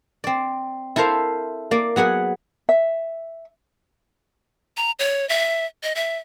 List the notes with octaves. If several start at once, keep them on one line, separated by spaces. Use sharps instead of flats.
C4 D5
E4 A4 A#4 C5 F5
A#3 D5
F#3 B3 G#4 F#5
E5
A#5
C#5
E5
D#5
E5